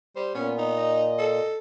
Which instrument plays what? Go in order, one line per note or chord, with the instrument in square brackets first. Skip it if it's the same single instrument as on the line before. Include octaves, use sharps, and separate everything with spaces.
[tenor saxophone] G3 [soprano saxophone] C5
[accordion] A#2 [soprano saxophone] B3 [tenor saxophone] C#4
[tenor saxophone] D#4
[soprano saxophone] D#5
[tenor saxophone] A4